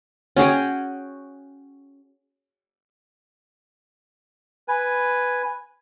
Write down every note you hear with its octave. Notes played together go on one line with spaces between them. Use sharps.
C#4 F#4 G#4 G5
B4 G#5